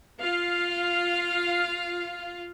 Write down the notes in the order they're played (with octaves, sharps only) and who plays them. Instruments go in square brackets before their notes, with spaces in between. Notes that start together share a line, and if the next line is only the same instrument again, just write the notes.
[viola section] F4 F5